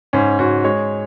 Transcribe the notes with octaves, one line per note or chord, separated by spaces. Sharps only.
G#2 C#4
G#2 F#4
G#3 C#5